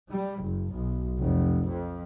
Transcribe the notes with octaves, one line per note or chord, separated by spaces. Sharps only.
G3
F#1
B1
F1
F2